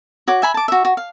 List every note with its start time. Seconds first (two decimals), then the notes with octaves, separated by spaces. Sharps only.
0.28 F#4 C#5 D6
0.42 E5 G#5 B5
0.54 A5 D6
0.68 F#4 E5
0.85 F#4
0.97 F5